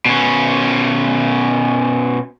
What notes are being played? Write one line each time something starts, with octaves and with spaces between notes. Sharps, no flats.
B2 C#4